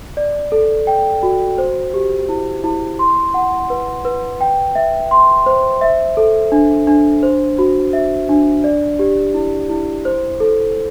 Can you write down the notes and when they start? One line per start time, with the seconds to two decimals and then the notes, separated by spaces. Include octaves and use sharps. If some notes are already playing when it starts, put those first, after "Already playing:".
0.17 D5
0.52 A4
0.87 G5
1.23 F#4
1.58 C5
1.94 G4
2.29 E4
2.64 E4
2.99 C6
3.34 F#5
3.70 B4
4.05 B4
4.41 G5
4.75 E5
5.11 C6
5.46 C5
5.81 E5
6.17 A4
6.52 D4
6.87 D4
7.23 C5
7.59 F#4
7.93 E5
8.29 D4
8.64 D5
8.99 G4
9.34 E4
9.70 E4
10.05 C5
10.40 A4